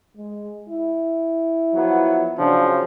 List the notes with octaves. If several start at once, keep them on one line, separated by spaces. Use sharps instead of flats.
G#3
E4
F3 F#3 B3
C#3 F3 F#3 D4